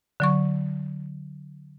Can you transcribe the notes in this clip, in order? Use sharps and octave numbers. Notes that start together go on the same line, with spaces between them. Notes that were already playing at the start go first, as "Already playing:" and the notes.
D3 F#3 C#6